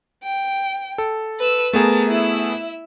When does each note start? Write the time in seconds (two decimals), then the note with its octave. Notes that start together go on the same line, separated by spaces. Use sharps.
0.23 G5
0.98 A4
1.39 B4 E6
1.73 A3 B3 G#4 A#4 A5
2.08 E4 E5